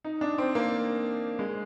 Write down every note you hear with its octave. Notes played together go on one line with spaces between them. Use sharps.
D#4
D4
C4
A#3
G#3